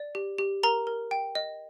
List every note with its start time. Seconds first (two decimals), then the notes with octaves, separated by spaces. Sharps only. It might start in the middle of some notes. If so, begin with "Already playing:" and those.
Already playing: D5
0.15 G4
0.38 G4
0.63 A#4 A#5
0.87 A#4
1.11 G5
1.35 D#5